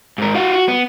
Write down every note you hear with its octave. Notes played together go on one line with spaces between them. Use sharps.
G#2 A#4
F4 F#4
F#4
B3